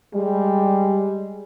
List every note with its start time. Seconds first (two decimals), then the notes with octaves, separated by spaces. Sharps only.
0.14 G3 G#3